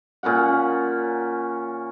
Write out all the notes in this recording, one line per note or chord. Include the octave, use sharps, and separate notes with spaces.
A#2 C#4 A#4 F#5